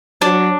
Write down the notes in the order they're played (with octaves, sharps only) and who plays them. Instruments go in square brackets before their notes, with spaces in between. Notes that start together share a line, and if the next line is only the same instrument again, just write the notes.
[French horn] F#3 [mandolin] D4